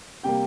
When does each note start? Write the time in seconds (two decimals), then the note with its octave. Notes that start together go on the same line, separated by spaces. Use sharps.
0.23 C3 G3 A#3 G4 G5